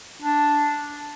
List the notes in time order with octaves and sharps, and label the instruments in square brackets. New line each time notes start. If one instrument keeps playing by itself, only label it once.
[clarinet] D4